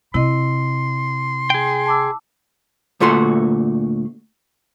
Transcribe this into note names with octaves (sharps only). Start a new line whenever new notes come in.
C3 E4 D#5 C6
G#4 G5
A5 D6 E6
D2 A#2 A3 F#4 C6